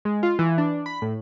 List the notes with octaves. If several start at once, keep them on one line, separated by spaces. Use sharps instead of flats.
G#3
F4
E3
D4
B5
A2